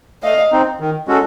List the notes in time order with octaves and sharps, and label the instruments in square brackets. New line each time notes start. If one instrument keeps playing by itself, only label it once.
[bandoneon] A3 [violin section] D#5 F5
[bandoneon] C4 D#4
D#3
G#3 C#4 F#4 A4